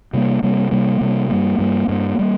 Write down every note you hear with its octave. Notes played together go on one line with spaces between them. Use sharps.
C3 G3 A#3
C3 G3 A#3
C3 G3 A#3
C3 G3 A#3
G2 G3 A#3
G2 G3 A#3
G2 G3 A#3
G3 A#3